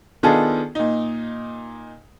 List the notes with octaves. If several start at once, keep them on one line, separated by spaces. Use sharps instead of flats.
D#3 B3 D4 F4 G#4 A4
A#2 D#4